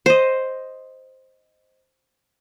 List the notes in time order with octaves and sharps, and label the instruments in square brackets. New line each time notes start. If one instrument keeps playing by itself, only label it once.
[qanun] C5 D#5